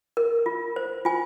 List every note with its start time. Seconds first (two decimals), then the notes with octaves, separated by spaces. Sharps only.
0.17 A#4
0.46 F4
0.76 C5
1.05 F4 G#5